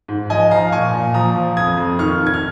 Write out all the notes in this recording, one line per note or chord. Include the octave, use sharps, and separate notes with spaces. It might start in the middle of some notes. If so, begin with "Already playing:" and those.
G#2
F3 D#5 G#5
F3 F5 A#5
A#2 G#5 C#6
A#2
F3 A#5 D#6
F3
F2 D#6 G#6
F2
D#3 C#6 F6
D#3
G#6
F6